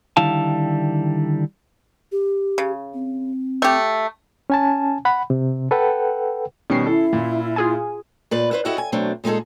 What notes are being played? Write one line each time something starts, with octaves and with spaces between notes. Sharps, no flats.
D3 D#3 G3 E4 F5 A5
G4
C#3
C4
A3 G4
C#4 G#5 A5
F#5 B5
C3
A4 B4 F#5 G5
B2 D#3 G3 C#4 C7
E4 A4
A#2
F4 G#4 G#5
A#2 B4 D5
E4 B4 C5
E4 F#4 G4 A4 D#5
G#5
B2 F#3 A3 C4 D4
A#2 G#3 D#4 G#4 A4